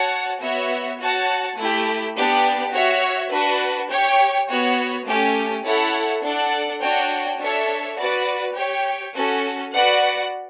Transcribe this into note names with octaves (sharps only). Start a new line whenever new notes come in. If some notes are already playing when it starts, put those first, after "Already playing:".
Already playing: F#4 C#5 F#5 A5
B3 F#4 C#5 E5
F#4 C#5 F#5 A5
A3 E4 G4
B3 D4 G4
F#4 C#5 E5
D4 F#4 B4
G4 C#5 G5
B3 F#4 C#5
A3 C#4 G4
E4 A4 C#5 F#5 A5
D4 A4 D5 F#5
D4 F#4 C#5 G5
D4 A4 C#5 E5
F#4 B4 D5
G4 C#5 G5
C#4 F#4 A4
F#4 B4 D5 F#5